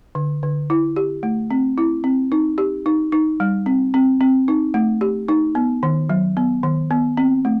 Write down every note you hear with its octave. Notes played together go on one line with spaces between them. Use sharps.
D3
D3
E4
G4
A3
C4
E4
C4
D#4
G4
D#4
D#4
G3
C4
C4
C4
D#4
A3
G4
D#4
B3
D#3
F#3
B3
D#3
B3
C4
A3